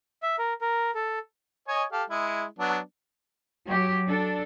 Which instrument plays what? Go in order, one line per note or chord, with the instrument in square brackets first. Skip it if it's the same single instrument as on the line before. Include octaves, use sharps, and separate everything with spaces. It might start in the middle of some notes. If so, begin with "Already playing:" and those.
[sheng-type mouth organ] E5
A#4
A#4
A4
[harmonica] C#5 D#5 G#5
G4 A4 F5
G#3 E4
F#3 B3 D4
[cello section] F#3 G4
D4 A4